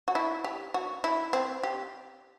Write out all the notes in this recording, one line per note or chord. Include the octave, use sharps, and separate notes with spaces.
F#4
E4
G4
F#4
E4
C4
G4